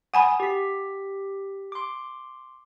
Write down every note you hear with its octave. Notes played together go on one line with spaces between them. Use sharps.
F#5 G#5 B5 D#6
G4 B6
C6 D6